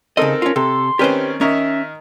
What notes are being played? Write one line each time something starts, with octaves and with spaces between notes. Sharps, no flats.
C#3 C4 D#4 A4 A#4 D#5
C#4 F4
C3 A4 C6
D#3 C4 C#4 G4 B4 C5
D#3 C#4 A#4 D#5 E5